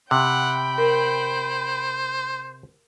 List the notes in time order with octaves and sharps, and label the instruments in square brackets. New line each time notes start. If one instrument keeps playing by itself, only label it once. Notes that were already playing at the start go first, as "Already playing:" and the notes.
[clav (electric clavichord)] C3 [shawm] F#5 [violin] G5 B5
[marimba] A#4 [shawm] C5